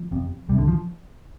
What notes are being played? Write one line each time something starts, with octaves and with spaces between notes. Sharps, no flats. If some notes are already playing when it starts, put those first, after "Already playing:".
Already playing: F3
F1 F2 C3
C2 C3 G3
D3
F3